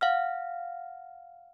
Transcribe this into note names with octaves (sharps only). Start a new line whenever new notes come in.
F5 F#5 F6